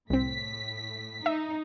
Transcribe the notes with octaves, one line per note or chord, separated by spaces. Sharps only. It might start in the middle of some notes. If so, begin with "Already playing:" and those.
C2 A2 C4 B6
D#4 E5